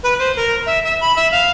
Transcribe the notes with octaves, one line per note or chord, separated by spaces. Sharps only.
B4
C5
A#4
E5
E5
B5
E5
F5